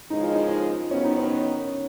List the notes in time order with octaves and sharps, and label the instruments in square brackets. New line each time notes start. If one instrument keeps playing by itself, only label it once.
[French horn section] D#2 C#3 F3 G#3 [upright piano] D#4
[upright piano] F4
D#4
[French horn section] D#3 F#3 B3 [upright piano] C#4
[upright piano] D#4
C#4